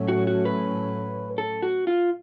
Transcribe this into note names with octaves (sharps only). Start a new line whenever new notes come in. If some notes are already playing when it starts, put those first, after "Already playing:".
Already playing: A2 F#3 A3 C#4
F#4
F#4
B4
A4
F#4
F4